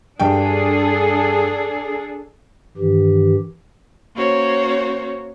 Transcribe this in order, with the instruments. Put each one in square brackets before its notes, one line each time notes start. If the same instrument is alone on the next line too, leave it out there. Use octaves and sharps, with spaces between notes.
[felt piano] G2 G5 [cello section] D4 G#4 A4
[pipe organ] G2 D#3 E3 G4
[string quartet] A#3 C#4 F#4 C5 C#5